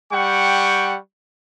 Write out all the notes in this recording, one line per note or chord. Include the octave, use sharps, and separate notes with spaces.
G3 F#5 G5 C#6